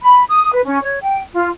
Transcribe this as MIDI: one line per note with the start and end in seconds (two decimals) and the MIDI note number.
0.02 0.23 83
0.29 0.51 87
0.52 0.61 71
0.66 0.80 61
0.83 0.99 73
1.03 1.22 79
1.33 1.49 65